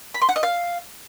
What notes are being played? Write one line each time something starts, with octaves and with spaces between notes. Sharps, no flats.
B5
C6
F#5
D#5
F5